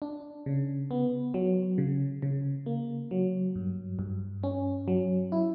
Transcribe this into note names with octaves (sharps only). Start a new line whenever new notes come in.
D4
C#3
B3
F#3
C#3
C#3
A#3
F#3
G2
G2
C#4
F#3
E4